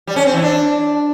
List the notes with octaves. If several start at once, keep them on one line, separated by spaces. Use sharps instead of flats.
G3
C#4
C4
E3
D4